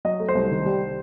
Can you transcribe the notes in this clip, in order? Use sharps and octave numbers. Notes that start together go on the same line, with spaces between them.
F#3 D#5
A3
C5
C2
D#3
G3